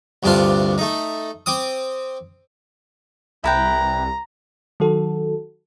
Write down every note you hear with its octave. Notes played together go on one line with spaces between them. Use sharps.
D2 G2 C3 D4 F4 C6
A3 D#4
C4 D6 D#6
C2 E4 B4 G5 A#5
D#3 F#3 F#4 A4